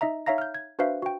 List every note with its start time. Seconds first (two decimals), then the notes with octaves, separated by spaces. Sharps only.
0.01 D#4 D#5 E5 A#5
0.26 D#4 C#5 E5 F5 A#5 A#6
0.38 F6 G6
0.54 G#6
0.79 D4 F#4 B4 C5 E5 F5
1.02 F#4 G5